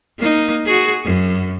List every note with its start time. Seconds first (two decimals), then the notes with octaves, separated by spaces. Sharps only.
0.19 A#3 D#4
0.65 F#4 G#4
1.04 F#2